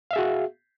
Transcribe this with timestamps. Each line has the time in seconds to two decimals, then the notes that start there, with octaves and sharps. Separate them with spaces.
0.11 F5
0.13 E5
0.16 G#4
0.18 F#4